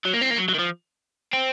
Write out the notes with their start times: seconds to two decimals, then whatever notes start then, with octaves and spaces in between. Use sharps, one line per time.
0.05 F#3
0.13 A#3
0.21 C4
0.30 A#3
0.38 F#3
0.48 F#3
0.54 D#3
0.59 F3
1.33 C4